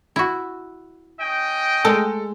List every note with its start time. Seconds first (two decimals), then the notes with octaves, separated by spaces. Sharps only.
0.16 E4 F#4
1.20 C#4 D#5 G5
1.85 G#3 A4